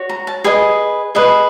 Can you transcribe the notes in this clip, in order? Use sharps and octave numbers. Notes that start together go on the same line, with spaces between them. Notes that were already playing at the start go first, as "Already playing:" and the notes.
Already playing: F#4 C#5
A#5
A5
G#4 B4 D#5 G#5
G#4 B4 D#5